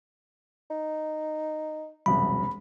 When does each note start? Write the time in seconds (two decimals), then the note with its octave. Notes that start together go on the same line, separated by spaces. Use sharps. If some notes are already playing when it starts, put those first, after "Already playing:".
0.70 D#4
2.06 E1 C2 F#2 B5